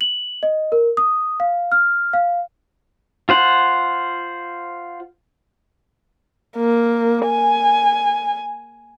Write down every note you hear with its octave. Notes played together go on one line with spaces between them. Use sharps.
F#7
D#5
A#4
D#6
F5
F6
F5
F4 C5 F#5
A#3
G#5